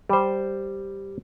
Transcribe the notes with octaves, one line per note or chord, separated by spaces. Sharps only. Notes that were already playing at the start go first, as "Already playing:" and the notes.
G3 C5